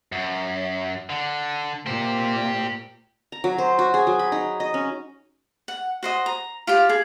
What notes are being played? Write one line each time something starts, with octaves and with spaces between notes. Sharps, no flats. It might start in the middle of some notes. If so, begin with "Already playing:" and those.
F#2
D3
A#2 G4 C5
A#5
F#3
C5
F#4
G#4
F#3
B5
D#4
D#5
C#4
F#5
F#4 C5 D#5
A#5
F4 G4 G5
G#4